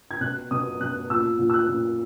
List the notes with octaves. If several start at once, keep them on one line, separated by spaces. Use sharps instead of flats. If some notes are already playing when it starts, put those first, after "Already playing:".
G#6
B2 F#6
B2 D#6
B2 F#6
A#2 E6
A#2
E6
F#6
A#2